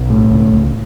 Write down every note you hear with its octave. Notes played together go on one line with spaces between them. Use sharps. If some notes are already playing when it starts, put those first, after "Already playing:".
Already playing: B1
A2
C#2
C#2